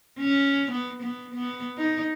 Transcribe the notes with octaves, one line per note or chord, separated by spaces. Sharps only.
C#4
B3
B3
B3
D#4